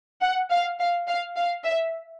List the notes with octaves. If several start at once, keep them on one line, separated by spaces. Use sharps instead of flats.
F#5
F5
F5
F5
F5
E5